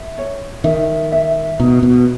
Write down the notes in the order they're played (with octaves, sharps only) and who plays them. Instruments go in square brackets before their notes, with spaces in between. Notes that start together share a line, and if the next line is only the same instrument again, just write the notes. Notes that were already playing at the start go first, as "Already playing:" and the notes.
Already playing: [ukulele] E5
C#5
[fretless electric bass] D#3 [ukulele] E5
[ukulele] E5
[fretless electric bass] B2 [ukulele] D#4
[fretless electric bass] B2